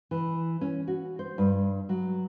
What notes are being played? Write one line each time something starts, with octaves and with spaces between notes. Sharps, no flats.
E3
C#4
F#4
C5
G2
F#3